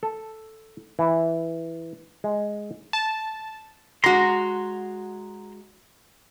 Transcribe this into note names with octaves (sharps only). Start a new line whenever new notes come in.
A4
E3
G#3
A5
G#3 F#4 A#5 C6